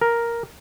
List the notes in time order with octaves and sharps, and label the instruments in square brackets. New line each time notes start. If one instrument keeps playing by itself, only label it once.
[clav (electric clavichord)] A#4